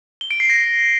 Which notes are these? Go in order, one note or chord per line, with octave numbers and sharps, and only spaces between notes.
G7
D7
C7
A#6